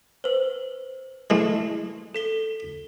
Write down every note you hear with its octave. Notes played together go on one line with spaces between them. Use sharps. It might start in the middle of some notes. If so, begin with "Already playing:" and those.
B4 C5
E3 G#3 A3
A4 B6 G7